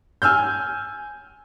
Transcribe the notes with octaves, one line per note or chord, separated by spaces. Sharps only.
G#5 E6 F6 G6